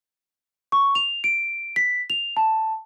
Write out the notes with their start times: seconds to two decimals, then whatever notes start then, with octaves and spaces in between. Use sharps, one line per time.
0.72 C#6
0.95 F7
1.24 D7
1.76 B6
2.10 F7
2.37 A5